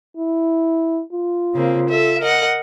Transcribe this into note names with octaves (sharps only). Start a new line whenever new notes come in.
E4
F4
C#3 A#3 C4
A4 E5
A#4 D#5 F#5